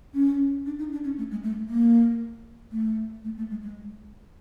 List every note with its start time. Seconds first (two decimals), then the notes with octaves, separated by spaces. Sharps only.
0.14 C#4
0.66 D4
0.79 D#4
0.92 D4
1.04 C#4
1.18 A3
1.31 G#3
1.43 A3
1.69 A#3
2.72 A3
3.25 A3
3.37 A3
3.50 G#3
3.62 G#3